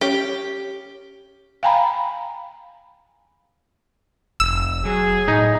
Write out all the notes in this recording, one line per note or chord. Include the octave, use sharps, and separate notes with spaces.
C#4 G4
F5 G5 G#5 A#5 B5
F1 E6
F#3 G#4
A2 D#4